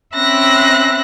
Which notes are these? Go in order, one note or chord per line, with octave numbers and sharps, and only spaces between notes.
C4 C#4 E5 B5 F#6 A#6